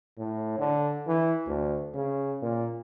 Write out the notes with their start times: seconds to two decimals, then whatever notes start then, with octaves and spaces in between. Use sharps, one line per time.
0.18 A2
0.59 D3
1.07 E3
1.47 D2
1.94 C#3
2.42 A#2